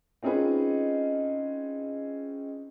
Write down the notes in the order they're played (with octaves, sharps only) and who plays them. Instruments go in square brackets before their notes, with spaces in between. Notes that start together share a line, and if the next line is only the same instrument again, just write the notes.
[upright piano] C4 C#4 D#4 F4 G#4 B4